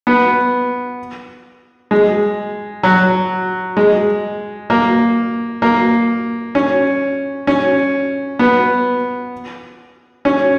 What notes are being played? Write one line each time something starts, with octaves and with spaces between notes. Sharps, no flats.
B3
G#3
F#3
G#3
A#3
A#3
C#4
C#4
B3
C#4